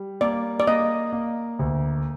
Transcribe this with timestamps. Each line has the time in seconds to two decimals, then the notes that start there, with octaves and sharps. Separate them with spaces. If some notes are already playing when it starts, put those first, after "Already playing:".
Already playing: G3
0.21 A#3 D5
0.60 D5
0.67 A#3 D#5
1.13 A#3
1.59 D2